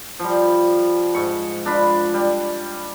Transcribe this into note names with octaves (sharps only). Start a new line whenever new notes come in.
F3 G3
G#2 C#6
D4 F4 B5
G3